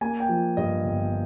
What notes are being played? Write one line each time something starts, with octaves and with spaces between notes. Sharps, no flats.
A#3 G#5
G5
F3
G2 D#5
G1